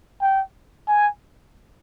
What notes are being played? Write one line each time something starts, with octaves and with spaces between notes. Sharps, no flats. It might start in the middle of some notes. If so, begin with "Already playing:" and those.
G5
G#5